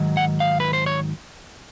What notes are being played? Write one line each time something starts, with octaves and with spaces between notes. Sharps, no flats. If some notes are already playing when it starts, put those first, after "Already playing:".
Already playing: G#2 D#3 F#3
F#5
F5
B4
C5
C#5